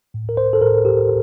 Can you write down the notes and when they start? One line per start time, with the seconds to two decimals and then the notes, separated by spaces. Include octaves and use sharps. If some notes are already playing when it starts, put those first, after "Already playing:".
0.14 A2
0.29 A#4
0.37 C5
0.53 A4
0.62 A2 A#4
0.85 G4